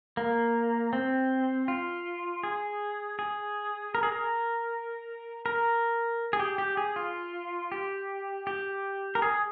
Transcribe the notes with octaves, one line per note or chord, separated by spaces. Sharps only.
A#3
C4
F4
G#4
G#4
A#4
G#4
A#4
A#4
G#4
G4
G4
G#4
F4
G4
G4
A#4
G#4